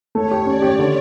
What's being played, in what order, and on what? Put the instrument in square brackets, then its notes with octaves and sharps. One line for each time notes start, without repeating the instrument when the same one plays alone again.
[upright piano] A3 [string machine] C#5
[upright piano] G4
[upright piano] C#4 [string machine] D5
[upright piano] G4
D3